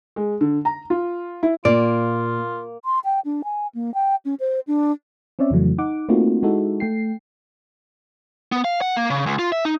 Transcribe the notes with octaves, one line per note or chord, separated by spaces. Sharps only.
G#3
D3
A#5
F4
E4
A#2 A#3 F4 D5
C6
G5
D4
G#5
A#3
G5
C#4
C5
D4
C4 C#4 C#5 D5 E5
F2 C#3 E3 F#3 A3
D#4 F#5 D6
A3 A#3 C4 D#4 F4 F#4
G#3 D#4 E4 F#4 A4
A3 G5 C7
B3
F5
F#5
A#3
C#3
C#2
F4
E5
D#4